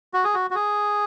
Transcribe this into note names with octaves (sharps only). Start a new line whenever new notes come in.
F#4
G#4
F#4
F#4
G#4